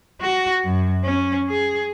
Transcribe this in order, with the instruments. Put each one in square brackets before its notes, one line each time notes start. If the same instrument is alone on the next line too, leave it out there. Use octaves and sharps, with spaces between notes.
[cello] F#4
F#2
C#4
G#4